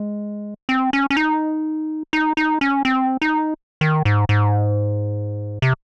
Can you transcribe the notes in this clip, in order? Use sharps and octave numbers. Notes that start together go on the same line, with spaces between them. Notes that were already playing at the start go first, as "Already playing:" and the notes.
Already playing: G#3
C4
C#4
C#4
D#4
D#4
D#4
C#4
C4
D#4
D#3
G#2
G#2
C3